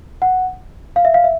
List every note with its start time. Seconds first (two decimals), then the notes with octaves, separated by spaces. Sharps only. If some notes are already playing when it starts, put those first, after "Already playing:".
0.22 F#5
0.96 F5
1.05 E5
1.14 F5
1.24 E5